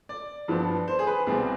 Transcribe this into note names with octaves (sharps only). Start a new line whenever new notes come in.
D5
G2 F3 B3 D4
C5
G#4
B4
C2 B2 G3 C4 G#4